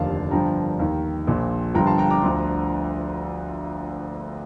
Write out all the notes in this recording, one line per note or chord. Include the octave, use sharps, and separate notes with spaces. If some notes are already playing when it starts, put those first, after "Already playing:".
Already playing: F1 D#2 D3 F3 F5 A5
G1 G2 D3 F3 G5 A#5
D#2 D#3
A#1 A#2 F3
G1 G2 D3 F3 G5 A#5
A5 C6
G5 A#5
A#5 D6
D2 D3 F3